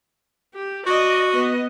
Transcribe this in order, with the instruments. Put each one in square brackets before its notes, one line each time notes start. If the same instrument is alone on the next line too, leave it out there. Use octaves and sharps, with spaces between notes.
[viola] G4
[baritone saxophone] F#4 [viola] D5 D#5
[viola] B3 D#5